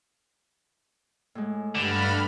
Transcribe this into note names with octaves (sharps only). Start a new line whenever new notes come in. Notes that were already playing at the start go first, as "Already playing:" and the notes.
A2 G#3
G2 D3 B5 F6